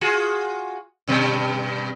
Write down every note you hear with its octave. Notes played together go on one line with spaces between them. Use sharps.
F4 F#4 G#4
G2 B2 G3